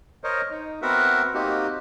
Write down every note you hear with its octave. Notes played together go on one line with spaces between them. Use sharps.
A#4 C5 C#5 D#5
D#4
B3 C4 F#4 A#4 E5 F#5
A#3 C4 D#4 F#4 G4